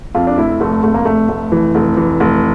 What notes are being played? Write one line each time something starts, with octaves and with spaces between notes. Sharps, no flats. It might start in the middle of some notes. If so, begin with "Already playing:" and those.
F2 F4
D4
F1 E4
F1 A3
F1 A3
A#3
F1 A3
F1
E3
F1
E3
F1